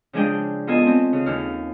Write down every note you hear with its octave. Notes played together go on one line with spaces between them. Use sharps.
C#3 F3 G#3 D4 G#4 G5
B3 F4 A4 D#5 G#5
C4 C#4
C#3
D#2 C#4 F6